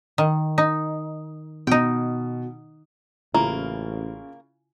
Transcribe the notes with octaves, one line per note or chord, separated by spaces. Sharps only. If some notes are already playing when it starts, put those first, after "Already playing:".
D#3
D#4
B2 D#4 G5
A1 C#3 A#3 E4 F4